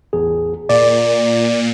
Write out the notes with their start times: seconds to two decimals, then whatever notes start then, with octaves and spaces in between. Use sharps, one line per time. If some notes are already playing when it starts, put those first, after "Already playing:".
0.13 A1 E2 G#4
0.69 A#2 D5